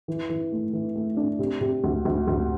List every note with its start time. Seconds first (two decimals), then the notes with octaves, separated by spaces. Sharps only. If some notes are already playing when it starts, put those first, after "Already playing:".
0.08 E3
0.29 E3
0.52 A3
0.73 E3
0.95 A3
1.17 D4
1.39 C3
1.61 C3
1.84 D2
2.05 D2
2.27 D2